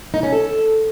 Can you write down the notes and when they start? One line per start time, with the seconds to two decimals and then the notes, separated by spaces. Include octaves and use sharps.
0.14 D#4
0.23 C#4
0.32 A4